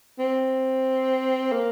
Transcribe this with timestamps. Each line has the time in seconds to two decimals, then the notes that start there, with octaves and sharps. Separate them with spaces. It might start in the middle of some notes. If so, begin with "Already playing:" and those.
0.19 C4
1.52 A#3